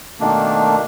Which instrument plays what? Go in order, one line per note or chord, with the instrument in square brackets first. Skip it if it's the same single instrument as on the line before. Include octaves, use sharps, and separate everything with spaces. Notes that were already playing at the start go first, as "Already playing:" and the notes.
[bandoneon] B2 D#3 A3 A#3 D4